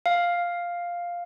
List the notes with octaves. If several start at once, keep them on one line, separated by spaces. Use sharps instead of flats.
F5